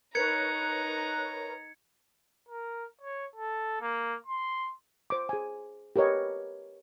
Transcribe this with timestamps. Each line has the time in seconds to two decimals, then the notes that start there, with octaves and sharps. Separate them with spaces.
0.15 D#4 A#4 B4 C#5 A#5 F#6 G#6 C#7
2.49 A#4
3.01 C#5
3.36 A4
3.81 A#3
4.26 C6
5.10 C5 D6
5.29 G#4 G#5
5.96 G4 A#4 B4 C#5 D#5